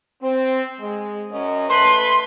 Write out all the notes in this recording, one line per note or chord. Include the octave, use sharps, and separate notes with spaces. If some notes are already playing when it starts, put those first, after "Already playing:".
C4
G#3
F#2 C#4 D#5
A3 B4 C6